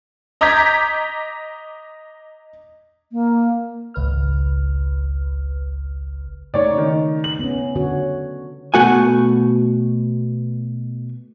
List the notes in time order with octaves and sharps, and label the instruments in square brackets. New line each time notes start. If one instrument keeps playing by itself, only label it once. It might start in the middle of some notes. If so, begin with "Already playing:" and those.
[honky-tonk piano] D#5 A#5 D6 G6 G#6 B6
[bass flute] A#3
[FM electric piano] G#1 C#2 B4 F6
[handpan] C#3 A3 D#4 [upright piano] C#5 D5
[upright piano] D#3
F#7
[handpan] B3 C#4
D3 F#4 C#5
[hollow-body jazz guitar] B2 A3 F#4 G#5